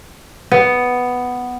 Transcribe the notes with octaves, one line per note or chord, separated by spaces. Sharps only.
B3